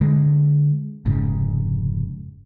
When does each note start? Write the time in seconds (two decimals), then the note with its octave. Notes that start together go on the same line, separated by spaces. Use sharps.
0.01 D3 G#3
1.05 F1 G#2 C#3